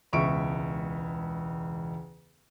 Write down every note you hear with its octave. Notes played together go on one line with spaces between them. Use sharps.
E1 C#2 E5 C#6 D7